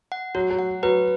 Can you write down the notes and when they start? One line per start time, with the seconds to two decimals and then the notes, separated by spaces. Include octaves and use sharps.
0.12 F#5
0.35 F#3 F#4
0.50 F#3
0.59 F#5
0.83 F#3 B4